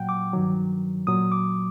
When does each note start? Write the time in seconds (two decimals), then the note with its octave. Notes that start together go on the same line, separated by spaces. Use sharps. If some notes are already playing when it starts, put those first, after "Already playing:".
Already playing: A#2 F#3 F#5 G5
0.09 D6
0.34 G2 D#3 F#3
1.07 A#2 F#3 D#6
1.32 D6